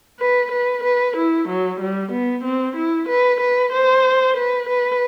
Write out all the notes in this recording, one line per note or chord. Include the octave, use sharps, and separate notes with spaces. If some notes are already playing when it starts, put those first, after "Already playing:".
B4
B4
B4
E4
F#3
G3
B3
C4
E4
B4
B4
C5
B4
B4